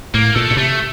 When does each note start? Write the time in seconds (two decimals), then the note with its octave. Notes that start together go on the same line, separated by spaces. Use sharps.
0.14 A2 A#3
0.35 A#2 A3
0.51 A#2
0.57 C3 A3